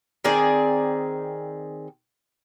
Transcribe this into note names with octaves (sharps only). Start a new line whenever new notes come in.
D#3 C4 G#4 D5